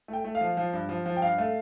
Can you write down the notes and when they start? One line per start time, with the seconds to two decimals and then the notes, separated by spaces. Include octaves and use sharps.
0.08 A3 G5
0.25 A3
0.35 F5
0.41 F3
0.57 F3
0.73 G2
0.89 F3
1.06 F3
1.17 G5
1.22 G2 F5
1.38 A3